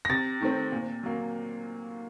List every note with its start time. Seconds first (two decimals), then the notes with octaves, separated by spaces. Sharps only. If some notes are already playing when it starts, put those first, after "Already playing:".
0.05 A#6
0.09 C3 A6
0.41 D#3 A3 C4
0.72 A#2
1.03 F#3 A#3